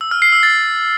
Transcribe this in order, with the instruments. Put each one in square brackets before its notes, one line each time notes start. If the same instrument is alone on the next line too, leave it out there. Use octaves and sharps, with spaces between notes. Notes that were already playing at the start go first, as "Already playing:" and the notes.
[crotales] E6
F6
C7
E6
A6